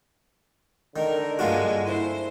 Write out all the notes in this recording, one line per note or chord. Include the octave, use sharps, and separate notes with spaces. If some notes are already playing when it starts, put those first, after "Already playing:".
D3 D#3 A#4
G2 G#3 A#3 F4 F#4
E4 C5